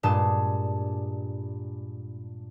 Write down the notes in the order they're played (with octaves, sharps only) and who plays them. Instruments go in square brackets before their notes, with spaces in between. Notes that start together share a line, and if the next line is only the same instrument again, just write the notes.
[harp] G2 A#2 G#3 A5